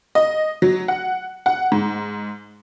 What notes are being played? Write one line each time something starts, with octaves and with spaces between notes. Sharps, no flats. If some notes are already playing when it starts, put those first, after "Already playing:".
D#5
F#3
F#5
F#5
G#2